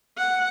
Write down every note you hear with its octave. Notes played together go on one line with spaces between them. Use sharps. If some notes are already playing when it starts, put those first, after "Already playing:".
F#5